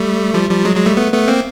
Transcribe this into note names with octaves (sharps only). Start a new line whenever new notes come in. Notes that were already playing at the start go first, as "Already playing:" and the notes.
Already playing: G3 A3
F3 G3
F3 G3
F#3 G#3
F#3 G#3
G3 A3
A3 B3
A3 B3
A#3 C4